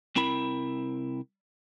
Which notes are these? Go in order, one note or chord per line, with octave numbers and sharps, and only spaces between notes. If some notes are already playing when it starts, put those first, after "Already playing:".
C2 C4 E4 A#4 B5